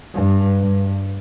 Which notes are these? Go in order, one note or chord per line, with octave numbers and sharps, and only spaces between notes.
G2
G2